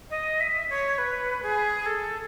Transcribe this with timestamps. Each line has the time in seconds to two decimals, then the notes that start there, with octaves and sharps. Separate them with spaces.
0.10 D#5
0.41 E5
0.70 C#5
0.98 B4
1.43 G#4
1.86 A4